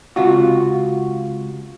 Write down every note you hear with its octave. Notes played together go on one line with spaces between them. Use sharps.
C#2 C3 F4 F#4